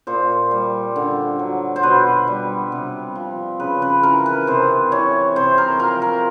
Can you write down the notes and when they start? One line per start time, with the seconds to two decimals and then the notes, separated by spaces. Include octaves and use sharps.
0.07 A#2 C5
0.51 G3
0.96 D3
1.39 F#3
1.76 C5
1.83 B2 B4
2.28 G3
2.72 C3
3.15 F3
3.60 C#3 B4
3.82 B4
4.03 E3 A#4
4.26 B4
4.47 C3 C5
4.92 E3 C#5
5.36 C3 C5
5.58 A#4
5.79 F3 A#4
6.02 A#4